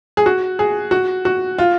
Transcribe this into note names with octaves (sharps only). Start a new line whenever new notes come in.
G#4
F#4
G#4
F#4
F#4
F4